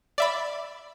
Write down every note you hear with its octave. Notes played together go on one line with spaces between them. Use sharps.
D5 E5 B5